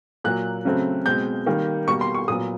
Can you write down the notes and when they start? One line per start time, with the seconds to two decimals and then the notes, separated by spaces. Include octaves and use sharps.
0.24 A#2 F#3 A#3 F#6
0.65 C#3 F#3 A3 C4
1.06 B2 G#3 C4 G6
1.46 D#3 G3 A#3
1.87 B2 G3 A#3 C#6
2.01 C6
2.15 C#6
2.28 A#2 F#3 B3 D#6